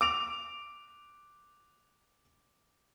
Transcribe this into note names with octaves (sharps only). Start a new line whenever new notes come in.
D6 D7 F7